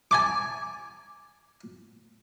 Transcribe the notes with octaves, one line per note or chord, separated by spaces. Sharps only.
G#5 A5 D6